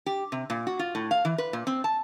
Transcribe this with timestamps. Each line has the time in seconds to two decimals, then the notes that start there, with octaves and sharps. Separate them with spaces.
0.06 G4
0.32 C3
0.50 A#2
0.67 F#4
0.79 F4
0.95 A2
1.11 F5
1.25 E3
1.38 B4
1.53 A#2
1.67 C4
1.84 A5